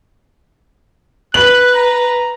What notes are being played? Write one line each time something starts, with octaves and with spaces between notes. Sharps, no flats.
B4 F#6 F#7
A#5